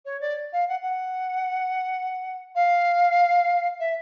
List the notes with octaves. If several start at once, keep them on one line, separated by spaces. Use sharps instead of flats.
C#5
D5
F5
F#5
F#5
F5
E5